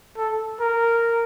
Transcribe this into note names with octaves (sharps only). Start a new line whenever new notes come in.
A4
A#4